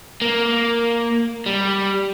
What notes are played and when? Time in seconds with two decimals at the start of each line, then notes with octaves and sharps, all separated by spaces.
0.22 A#3
1.46 G3